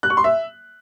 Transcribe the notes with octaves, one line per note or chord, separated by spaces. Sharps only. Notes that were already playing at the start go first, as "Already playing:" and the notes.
F#6
C#6
C6
E5